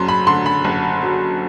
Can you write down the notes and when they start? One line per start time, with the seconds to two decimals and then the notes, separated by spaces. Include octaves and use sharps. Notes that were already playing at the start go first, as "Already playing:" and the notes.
Already playing: F#1 F#2 F#3 C6
0.08 B5
0.27 D3 C6
0.46 B5
0.64 F#1
1.02 F#3